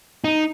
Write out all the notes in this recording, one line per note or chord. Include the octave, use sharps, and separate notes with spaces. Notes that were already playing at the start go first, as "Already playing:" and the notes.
D#4